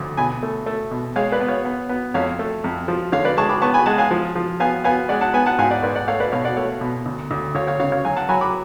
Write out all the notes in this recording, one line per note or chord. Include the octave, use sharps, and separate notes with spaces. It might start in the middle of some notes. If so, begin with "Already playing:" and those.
Already playing: D2 F3
B2 G#5 B5
A3
A3
B2
G#3 C#5 F5
B4 D5
B3
C#5 F5
B3
B3
F2 C#5 F5
A3
F2
F3
D3 C#5 F5
B4 D5
G#3 A5 C#6
B5 D6
B3 A5 C#6
G#5 B5
G#3 F#5 A5
F5 G#5
F3
F3
B3 F5 G#5
B3 F5 G#5
G#3 D5 F#5
F#5 A5
B3 G#5 B5
F#5 A5
G#2 F5 G#5
D5 F#5
G#2 B4 D5
D5 F#5
A3 C#5 F5
B4 D5
B2 C#5 F5
D5 F#5
A3 C#5 F5
B2
D2
D2
D2 C#5 F5
C#5 F5
C#3 C#5 F5
C#5 F5
F#3 F5 G#5
F#5 A5
F#3 G#5 B5
B5 D6